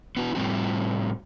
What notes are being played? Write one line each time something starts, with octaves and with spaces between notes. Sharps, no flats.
B3 E4 F#4
A2 G3 C4 F#4